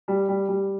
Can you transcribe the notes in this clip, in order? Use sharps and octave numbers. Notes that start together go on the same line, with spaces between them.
G3
G3
G3